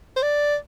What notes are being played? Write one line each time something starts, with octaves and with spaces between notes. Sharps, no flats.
C5
D5